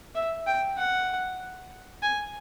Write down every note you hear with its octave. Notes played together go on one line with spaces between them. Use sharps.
E5
G5
F#5
G#5